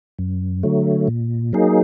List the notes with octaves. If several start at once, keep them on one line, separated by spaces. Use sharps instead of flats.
F#2
D3 F#3 A3
A#2
F#3 A#3 D#4 G#4